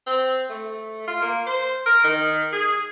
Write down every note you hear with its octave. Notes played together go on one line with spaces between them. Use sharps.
C4
A3
F4
A#3
C5
A#4
D#3
G#4